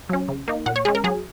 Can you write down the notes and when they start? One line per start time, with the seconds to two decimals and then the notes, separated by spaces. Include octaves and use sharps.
0.09 F#3 C#4
0.28 C#3
0.48 A#3 D#4
0.66 A#2 F#5
0.76 C#5
0.85 G#3 C#4 G#4
0.95 A#4
1.04 F#3 G#4